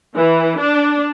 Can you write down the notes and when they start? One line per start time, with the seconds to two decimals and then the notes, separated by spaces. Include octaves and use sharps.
0.16 E3
0.58 D4